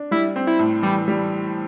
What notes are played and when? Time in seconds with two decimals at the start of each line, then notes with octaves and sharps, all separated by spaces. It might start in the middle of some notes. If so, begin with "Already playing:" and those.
Already playing: D4
0.11 G3 E4
0.36 C4
0.47 E4
0.59 A2
0.83 E3 G3
1.08 G3